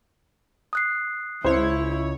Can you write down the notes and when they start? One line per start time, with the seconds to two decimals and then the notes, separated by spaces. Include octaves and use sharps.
0.73 D#6 F#6 C7
1.44 C#2 E4 C5 C#5